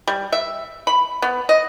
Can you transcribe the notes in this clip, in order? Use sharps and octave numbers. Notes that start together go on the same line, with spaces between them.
G3
E5
B5
B3
D#5